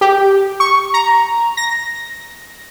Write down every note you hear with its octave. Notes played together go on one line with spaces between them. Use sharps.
G4
C#6
A#5
A#6